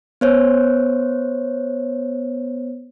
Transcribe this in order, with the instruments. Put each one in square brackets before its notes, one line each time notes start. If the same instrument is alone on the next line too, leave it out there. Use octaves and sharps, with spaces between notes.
[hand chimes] B3 C5 C#5